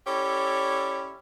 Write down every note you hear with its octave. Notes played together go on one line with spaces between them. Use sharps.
C#4 E4 G4 A4 C#5 D5